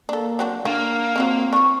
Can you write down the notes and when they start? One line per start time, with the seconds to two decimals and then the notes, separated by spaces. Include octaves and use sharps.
0.09 A#3 D4 A4
0.39 F#3 C4 D4 F#5
0.65 A#3 D4 F4 F5
1.16 D#3 F3 F#3 C4
1.53 F3 D4 C#6